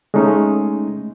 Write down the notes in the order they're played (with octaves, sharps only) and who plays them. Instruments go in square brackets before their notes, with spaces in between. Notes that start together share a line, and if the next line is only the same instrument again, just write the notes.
[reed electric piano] G#3 A3 C#4 D#4